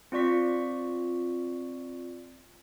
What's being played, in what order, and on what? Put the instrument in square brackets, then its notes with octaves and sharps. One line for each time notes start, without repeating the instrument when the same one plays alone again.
[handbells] C4 F4 D5 C#6 B6